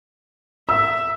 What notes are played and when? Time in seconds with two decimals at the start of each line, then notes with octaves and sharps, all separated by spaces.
0.69 E5 E6